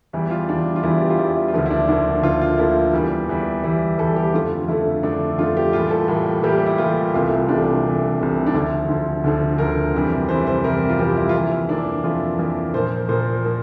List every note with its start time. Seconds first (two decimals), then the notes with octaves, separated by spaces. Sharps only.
0.13 E2 E3 G3 E4
0.31 F4
0.48 E2 E3 G3 D4
0.76 F4
0.83 E2 E3 G3 E4
1.01 G4
1.10 F4
1.18 E2 E3 G3 E4
1.36 E4
1.48 F4
1.53 D2 D3 F3 A#3 E4
1.66 E4
1.70 D4
1.88 D2 D3 F3 A#3 E4
2.23 D2 D3 F3 A#3 F4
2.41 F4
2.58 D2 D3 F3 A#3 E4
2.93 E2 E3 G3
3.29 E2 E3 G3
3.64 E2 E3 G3 E4
3.99 E2 E3 G3 A4
4.16 G4
4.33 F2 D3 A3 F4
4.68 F2 D3 A3 E4
5.03 F2 D3 A3 D4
5.38 F2 D3 A3 F4
5.57 G4
5.73 A2 E3 G3 A#3 F4
5.91 A4
6.08 A2 E3 G3 A#3
6.43 A2 E3 G3 A#3 G4
6.66 E4
6.78 A2 E3 G3 A#3 F4
7.14 C2 C3 E3 A3 F4
7.49 C2 C3 E3 A3 D4
7.84 C2 C3 E3 A3
8.18 C2 C3 E3 A3
8.47 D4
8.54 D2 D3 F3 E4
8.88 D2 D3 F3
9.24 D2 D3 F3
9.58 D2 D3 F3 A#4
9.94 F2 C3 E3 G3
10.29 F2 C3 E3 G3 C5
10.47 C5
10.64 F2 C3 E3 G3 A#4
10.89 F4
10.99 F2 C3 E3 G3 G4
11.17 E4
11.29 F4
11.34 F2 E3 A#3 E4
11.69 F2 E3 A#3 D4
12.04 F2 E3 A#3 F4
12.39 F2 E3 A#3
12.74 A#2 F3 A#3 C5
13.09 A#2 F3 A#3 C5
13.44 F3 A#3